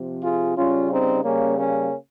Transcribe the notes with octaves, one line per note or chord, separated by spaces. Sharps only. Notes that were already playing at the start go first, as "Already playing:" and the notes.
Already playing: C3 F3
F4 G#4
C#3 G3 C#4 F4
C4 D#4
C#3 G3 A#3 C#4
A#3 C#4